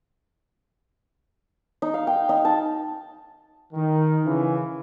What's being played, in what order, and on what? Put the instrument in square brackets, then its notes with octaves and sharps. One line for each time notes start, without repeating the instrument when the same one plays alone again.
[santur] D#4
F5
G5
D#4
A5
[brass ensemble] D#3
C#3 E3